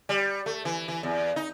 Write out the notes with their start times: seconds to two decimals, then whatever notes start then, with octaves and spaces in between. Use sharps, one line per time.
0.09 G3
0.46 A3
0.65 E3
0.88 E3
1.03 E2
1.36 D#4